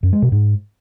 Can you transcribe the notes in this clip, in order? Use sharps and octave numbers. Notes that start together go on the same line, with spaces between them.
F#2
G#3
B2
G#2